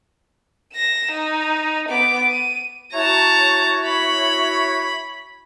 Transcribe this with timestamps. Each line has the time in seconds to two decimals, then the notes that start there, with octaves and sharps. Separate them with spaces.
0.74 A#6 E7
1.12 D#4
1.89 B3 D6
2.30 D#7
2.93 E4 F#4 C#5 A5 A#5
3.85 B5